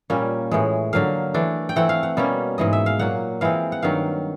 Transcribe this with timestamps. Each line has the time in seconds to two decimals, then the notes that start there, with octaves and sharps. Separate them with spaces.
0.10 A#2 G3 A#3 C#4
0.51 A2 E3 G#3
0.93 D3 F#3 A#3 F5
1.34 E3 A3 D4
1.69 G5
1.76 E3 A3 C4 F#5
1.89 F5
2.03 F#5
2.17 B2 G3 A#3 C#4
2.58 G#2 E3 G#3 D#5
2.73 E5
2.86 F5
2.99 A#2 F#3 A#3 F#5
3.41 E3 G#3 C4 F5
3.72 F#5
3.82 G2 D#3 F#3 F5